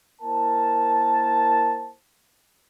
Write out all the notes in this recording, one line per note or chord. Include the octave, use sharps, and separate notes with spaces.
A#3 E4 A#4 C5 A5